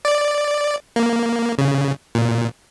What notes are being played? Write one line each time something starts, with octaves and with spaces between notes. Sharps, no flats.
D5
A#3
C#3
A#2